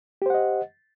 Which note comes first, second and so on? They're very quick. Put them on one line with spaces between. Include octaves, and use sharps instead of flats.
G4 C5 F#5 D#5